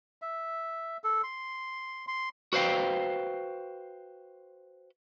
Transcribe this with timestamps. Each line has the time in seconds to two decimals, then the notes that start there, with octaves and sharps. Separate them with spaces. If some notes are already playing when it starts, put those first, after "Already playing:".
0.22 E5
1.04 A4
1.23 C6
2.08 C6
2.53 F#4 B4 C5 F5 G5